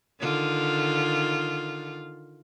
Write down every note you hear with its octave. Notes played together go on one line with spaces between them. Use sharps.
D3 D#3 F4